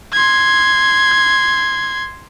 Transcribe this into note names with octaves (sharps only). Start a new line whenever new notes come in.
C6 G#6